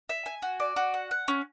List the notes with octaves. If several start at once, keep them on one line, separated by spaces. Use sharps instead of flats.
E5
G#5
F#4
D5
F#4
F#5
F#5
C#4